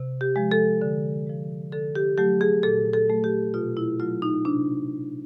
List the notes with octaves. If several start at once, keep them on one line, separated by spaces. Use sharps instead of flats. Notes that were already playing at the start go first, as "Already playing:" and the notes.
Already playing: C3
G4
F3 G#3
A4
D3
F3 G#3
D3 A4
G4
F#3 A3 G4
G#4
A#2 A4
A4
F#3 A3
G4
B2 F4
E4
F#3 A3 F4
D#4
C3 D4